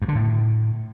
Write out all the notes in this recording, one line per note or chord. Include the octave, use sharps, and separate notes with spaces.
G2
D3
A2